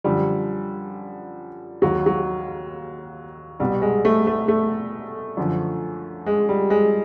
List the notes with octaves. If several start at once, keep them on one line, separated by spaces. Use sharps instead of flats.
F#2 D3 F3 G3
D#2 D#3 F#3
F#3
C2 B2 G3
G#3
A3
A3
A3
F#2 D3 F3
G#3
G3
G#3